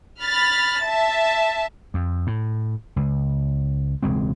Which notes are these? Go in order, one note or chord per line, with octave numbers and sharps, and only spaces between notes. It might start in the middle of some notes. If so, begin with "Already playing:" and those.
B5 F6 A6
E5 A5
F2
A2
C#2
E1 C#2 G#3 C4